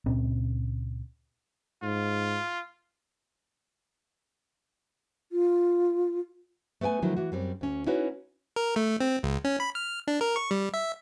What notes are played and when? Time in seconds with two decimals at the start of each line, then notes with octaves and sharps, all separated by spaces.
0.06 C#2 A#2 C4 C#4
1.83 G#2 F4
5.32 F4
6.81 A3 B3 B4 G5 G#5
7.02 D3 D#3 F3 F#3 A3 E4
7.17 E3 F#4
7.32 F#2 G3 C4
7.61 D2 C#4
7.86 C#4 D#4 E4 F#4 B4 C#5
8.56 A#4
8.76 A3
9.00 C4
9.23 C#2
9.44 C#4
9.60 B5
9.75 F6
10.08 D4
10.21 A#4
10.36 C#6
10.51 G3
10.74 E5